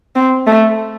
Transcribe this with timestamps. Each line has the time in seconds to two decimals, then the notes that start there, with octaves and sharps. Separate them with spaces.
0.15 C4
0.47 A3